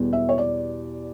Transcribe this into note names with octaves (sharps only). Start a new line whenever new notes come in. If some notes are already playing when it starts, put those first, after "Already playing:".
Already playing: E2 B2 G3
E5
C#5
D5